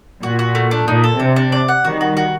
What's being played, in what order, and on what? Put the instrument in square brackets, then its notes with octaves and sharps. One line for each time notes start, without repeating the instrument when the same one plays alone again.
[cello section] A#2 [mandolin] F#4
[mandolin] F#4
A3
D4
[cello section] A#2 [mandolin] D#4
[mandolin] A4
[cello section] C3 [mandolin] D4
[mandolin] D4
D5
F#5
[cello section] D#3 G3 [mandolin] F#4
[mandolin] F#4
F#4